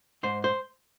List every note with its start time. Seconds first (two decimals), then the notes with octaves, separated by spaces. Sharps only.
0.23 G#2 C5
0.44 C5